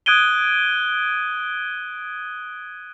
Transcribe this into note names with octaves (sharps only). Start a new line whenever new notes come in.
D#6 F#6 G#6 D7 D#7 G7